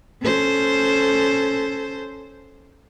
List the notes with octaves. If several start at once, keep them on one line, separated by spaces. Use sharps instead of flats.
C#4 A4 C5